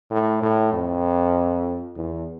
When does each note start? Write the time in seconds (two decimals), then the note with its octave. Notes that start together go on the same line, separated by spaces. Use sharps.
0.11 A2
0.42 A2
0.73 F2
1.96 E2